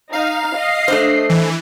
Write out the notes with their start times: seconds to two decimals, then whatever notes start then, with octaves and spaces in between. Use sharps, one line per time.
0.13 D#4 F5
0.56 D#5 C7
0.88 A3 D4 C5
1.29 E3